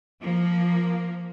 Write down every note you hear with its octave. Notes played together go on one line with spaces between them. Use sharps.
F3 A#3